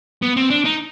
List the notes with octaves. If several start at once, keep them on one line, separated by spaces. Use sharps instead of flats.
B3
C4
D4
D#4